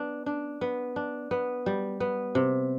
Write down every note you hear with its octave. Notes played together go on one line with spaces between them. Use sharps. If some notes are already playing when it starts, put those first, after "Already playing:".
Already playing: B3 D4
D4
B3
D4
B3
G3
B3
C3